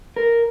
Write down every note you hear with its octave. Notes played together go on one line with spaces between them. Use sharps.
A#4